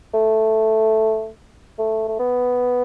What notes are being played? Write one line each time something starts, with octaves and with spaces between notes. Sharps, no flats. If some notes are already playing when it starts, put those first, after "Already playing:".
A3
A3
A3
B3